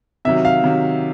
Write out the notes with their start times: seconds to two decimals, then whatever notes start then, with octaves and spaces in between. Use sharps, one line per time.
0.25 C3 D#3 F#3 E5
0.45 F5
0.64 C3 D#3 F#3